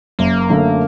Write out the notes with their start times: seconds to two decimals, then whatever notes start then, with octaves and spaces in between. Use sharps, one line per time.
0.19 F#1 A#3
0.50 F#2 D3 A3